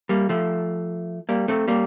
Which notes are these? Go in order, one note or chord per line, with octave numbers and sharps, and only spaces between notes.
G3 A#3
F3 A3
G3 A#3
A3 C4
G3 A#3